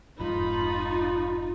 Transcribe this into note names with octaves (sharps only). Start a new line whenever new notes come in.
F1 F2 G#2 D#4 F4 B5